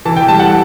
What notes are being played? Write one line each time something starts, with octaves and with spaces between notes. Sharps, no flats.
E3 A5
G5
G3 A5
F#5